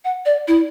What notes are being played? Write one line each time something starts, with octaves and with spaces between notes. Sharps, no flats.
F#5
D5
E4